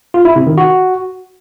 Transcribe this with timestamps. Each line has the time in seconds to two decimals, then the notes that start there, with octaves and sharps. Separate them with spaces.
0.14 F4
0.25 E4
0.36 C3
0.47 D#3
0.58 F#4